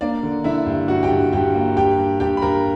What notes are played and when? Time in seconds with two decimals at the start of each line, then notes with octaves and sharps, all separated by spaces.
0.01 A#3 D4 D5
0.23 D3
0.44 D3 E4 E5
0.66 G2
0.88 G2 F#4 F#5
1.03 G4 G5
1.11 G2
1.32 G2 G4 G5
1.55 A#3
1.77 G2 G4 G5
1.98 G2
2.20 G2 G4 G5
2.37 B5
2.42 G2 A#4 A#5